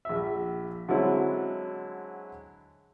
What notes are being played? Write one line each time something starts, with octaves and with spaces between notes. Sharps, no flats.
A#1 E5
D3 F#3 G#3 C4 C#4 E4